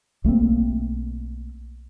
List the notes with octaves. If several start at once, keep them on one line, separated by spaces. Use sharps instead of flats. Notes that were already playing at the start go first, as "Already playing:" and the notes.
B1 A3 A#3 C4